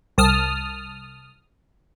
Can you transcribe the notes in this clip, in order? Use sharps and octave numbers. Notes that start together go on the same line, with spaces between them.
C2 A5 D#6 F6